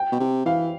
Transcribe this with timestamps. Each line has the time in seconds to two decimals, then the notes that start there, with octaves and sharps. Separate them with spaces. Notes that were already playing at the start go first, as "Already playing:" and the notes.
Already playing: G5
0.12 B2
0.20 C3
0.45 E3 F5